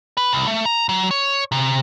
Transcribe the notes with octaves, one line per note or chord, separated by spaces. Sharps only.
B4
C2
A3
A#5
F#3
C#5
C3